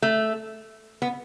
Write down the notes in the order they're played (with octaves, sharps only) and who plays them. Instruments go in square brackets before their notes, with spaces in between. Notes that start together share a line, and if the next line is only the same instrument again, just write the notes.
[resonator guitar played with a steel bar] A3
B3